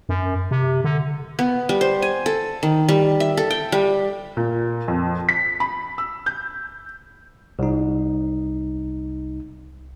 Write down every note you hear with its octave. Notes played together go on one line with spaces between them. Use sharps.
F#2
C3
D3
B3
G3
C5
G#5
A4
D#3
G3
E5
A4
G5
G3
A#2
F2
B6
B5
E6
G6
C2 D#4